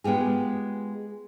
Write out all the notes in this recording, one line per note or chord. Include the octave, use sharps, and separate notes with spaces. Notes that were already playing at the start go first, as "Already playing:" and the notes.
G#3 B3 F4 G4 G#4